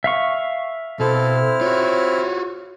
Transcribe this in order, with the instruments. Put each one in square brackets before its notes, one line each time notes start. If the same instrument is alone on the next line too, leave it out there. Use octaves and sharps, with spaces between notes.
[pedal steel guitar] E5 F5 C#6
[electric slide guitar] B2 [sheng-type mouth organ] C4 E4 F6 [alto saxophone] A4
[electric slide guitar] F4 F#4 [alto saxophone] C#5